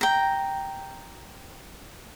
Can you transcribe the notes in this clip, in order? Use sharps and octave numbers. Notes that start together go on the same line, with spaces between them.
G5 A#5